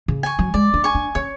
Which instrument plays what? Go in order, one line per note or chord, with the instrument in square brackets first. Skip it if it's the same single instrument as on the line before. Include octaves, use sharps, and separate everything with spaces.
[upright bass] C#3
[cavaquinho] G#5 C#6
[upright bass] F#3
[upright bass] G#3 [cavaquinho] D5
[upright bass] D4
[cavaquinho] G#5 C#6
[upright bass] D4
[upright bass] C#4 [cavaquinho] C#5